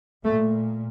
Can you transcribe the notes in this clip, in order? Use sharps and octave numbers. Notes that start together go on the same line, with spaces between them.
A#2 A3